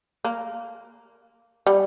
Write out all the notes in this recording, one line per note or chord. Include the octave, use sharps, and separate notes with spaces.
A#3
G3